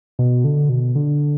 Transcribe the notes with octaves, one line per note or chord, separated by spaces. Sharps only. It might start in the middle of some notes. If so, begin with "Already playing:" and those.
B2
D3
B2
D3